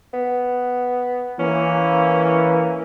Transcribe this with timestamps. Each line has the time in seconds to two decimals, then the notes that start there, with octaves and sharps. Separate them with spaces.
0.14 B3
1.39 E3 A#3 C#4